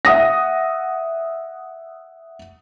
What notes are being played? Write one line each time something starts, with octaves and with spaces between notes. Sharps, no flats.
E5 F#5 D#6 A#6